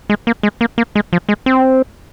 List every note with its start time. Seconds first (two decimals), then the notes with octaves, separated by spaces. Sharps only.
0.10 G#3
0.27 A#3
0.43 G#3
0.61 A#3
0.78 A#3
0.95 G#3
1.13 F3
1.29 G#3
1.46 C4